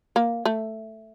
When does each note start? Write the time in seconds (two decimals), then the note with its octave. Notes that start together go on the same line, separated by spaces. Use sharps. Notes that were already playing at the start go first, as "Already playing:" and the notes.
0.16 A#3
0.45 A3